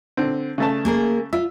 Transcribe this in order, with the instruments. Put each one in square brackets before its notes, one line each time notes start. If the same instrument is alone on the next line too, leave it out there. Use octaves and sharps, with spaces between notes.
[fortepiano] D3 C4
C#3 A3 A5
[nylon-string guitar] A#3 G#4 A#4
[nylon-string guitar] F4 [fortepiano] E5